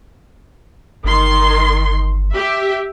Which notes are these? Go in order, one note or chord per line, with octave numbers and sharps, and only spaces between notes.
G1 D#3 C6
G4 E5